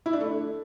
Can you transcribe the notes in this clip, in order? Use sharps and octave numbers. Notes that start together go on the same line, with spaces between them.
E4
D4
A3